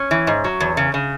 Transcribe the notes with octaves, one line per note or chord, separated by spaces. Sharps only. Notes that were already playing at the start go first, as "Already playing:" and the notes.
Already playing: C#4
E3
G#2
F#3
E2
C#3
C#3